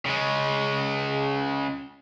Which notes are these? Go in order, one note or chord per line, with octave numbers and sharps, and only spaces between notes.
C#3 G#3